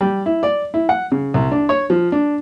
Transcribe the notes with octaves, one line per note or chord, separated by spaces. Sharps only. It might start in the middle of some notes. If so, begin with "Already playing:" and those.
G3
E4
D5
E4
F#5
C#3
C2
D4
C#5
F3
D4